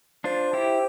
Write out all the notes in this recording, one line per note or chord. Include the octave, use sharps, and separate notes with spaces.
D4 F4 C5
E4 G4